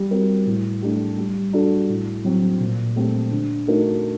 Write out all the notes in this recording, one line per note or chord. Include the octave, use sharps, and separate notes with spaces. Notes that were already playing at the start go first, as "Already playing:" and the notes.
Already playing: G3
C4 F#4 A#4
A2
A3 D4 G4
G3
D4 F#4 A4
A2
F#3 C4
A#2
A3 C4 G4
D3
A3 D#4 F#4 A#4